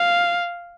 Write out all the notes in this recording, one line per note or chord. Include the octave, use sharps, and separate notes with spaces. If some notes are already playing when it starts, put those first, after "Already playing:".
Already playing: F5